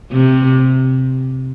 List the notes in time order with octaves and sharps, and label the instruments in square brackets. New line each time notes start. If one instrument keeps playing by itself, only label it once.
[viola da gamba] C3